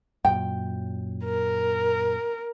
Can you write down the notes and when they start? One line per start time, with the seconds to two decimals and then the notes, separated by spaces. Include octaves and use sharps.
0.25 F#2 A#2 F#3 G5
1.25 A#4